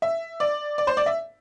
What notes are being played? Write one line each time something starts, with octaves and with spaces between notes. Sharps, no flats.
E5
D5
D5
C5
D5
E5